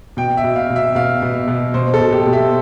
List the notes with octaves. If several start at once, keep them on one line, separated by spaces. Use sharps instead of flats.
B2 G5
E5
B2
F5
B2
E5
B2 F5
B2
B2
B2 C5
A4
B2
G4
B2
E5